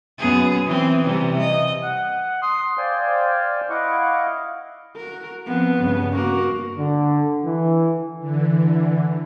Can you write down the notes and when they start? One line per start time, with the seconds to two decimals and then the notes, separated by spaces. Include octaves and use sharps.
0.18 F#2 B3 G#4
0.66 E3 C4
1.04 C3 E3 G3
1.40 D#5
1.83 F#5
2.42 C6 D#6
2.78 C5 D5 F5 G5 G#5
3.70 E4 D#5 F5 F#5 C#6 D6
4.96 F#4 A#4
5.46 F3 B3 C4
5.79 G2 C#3
6.15 A#3 F#4 A#4
6.76 D3
7.44 E3
8.19 D3 E3